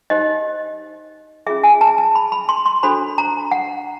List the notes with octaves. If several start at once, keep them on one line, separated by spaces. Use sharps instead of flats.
D#4 G4 C5 D#5
C#4 F4 G#4 E5
G#5
A5
A5
B5
B5
C6
C6
D4 F#4 A4 C5 B5
A#5
F#5